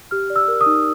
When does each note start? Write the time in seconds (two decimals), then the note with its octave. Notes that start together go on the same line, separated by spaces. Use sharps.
0.11 G4 F6
0.30 D5
0.36 E6
0.48 A#4
0.61 D#6
0.66 D#4